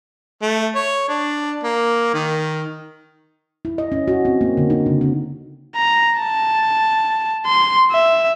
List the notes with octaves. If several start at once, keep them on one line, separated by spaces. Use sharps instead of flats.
A3
C#5
D4
A#3
D#3
E4
D#5
C#4
F#4
C4
A#3
D3
D#4
C#3
C4
A#5
A5
C6
E5